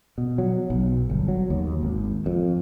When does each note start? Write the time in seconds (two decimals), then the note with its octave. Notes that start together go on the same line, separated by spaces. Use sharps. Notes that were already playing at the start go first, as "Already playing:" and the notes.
0.18 B2
0.38 F#3
0.70 B1
1.10 G1
1.28 F#3
1.50 D#2
1.83 G#1
2.26 F2